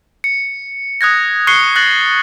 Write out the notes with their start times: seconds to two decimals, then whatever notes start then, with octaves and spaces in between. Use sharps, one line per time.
0.24 C#7
1.01 D#6 F#6 G#6 A#6
1.47 C#6 F#6 C7 C#7 G7
1.76 F#6 A6 A#6 F#7